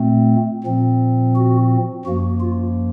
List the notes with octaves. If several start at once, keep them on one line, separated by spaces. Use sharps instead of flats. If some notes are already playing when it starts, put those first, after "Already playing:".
Already playing: A#2 A3 C4
A#2 F3 C4
F#4
F#2 F3 A#3 F#4
F4